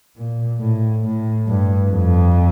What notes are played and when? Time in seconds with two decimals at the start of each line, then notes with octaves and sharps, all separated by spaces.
0.17 A#2
0.61 A2
1.04 A2
1.47 G2
1.91 F2